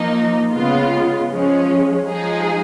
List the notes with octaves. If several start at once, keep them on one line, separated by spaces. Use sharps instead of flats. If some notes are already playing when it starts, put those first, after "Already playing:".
Already playing: F3 A#3 D#4
C#3 G#3 B3 F4
F3 G#3 C#4
F3 G#3 D#4 G#4